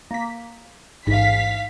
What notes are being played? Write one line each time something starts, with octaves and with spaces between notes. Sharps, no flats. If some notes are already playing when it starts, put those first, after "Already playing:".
A#3 B6
A1 G#2 F5 B6